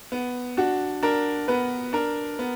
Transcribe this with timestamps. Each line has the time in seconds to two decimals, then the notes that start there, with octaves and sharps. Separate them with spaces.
0.12 B3
0.57 D4 F#4
1.03 D4 A#4
1.48 B3 B4
1.93 D4 A#4
2.39 B3